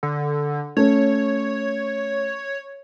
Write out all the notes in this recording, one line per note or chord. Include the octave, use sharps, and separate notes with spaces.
D3
A3 C#4 C#5